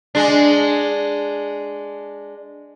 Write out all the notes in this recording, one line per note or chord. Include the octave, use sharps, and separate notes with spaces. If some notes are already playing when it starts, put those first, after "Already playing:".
G#3 D4